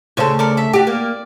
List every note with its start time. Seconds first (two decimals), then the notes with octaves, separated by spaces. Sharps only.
0.17 D2 C#3 A4 C5 C#5
0.39 A4 A#4 D5
0.57 A4 E5
0.73 F#4 G4 D5
0.87 A#3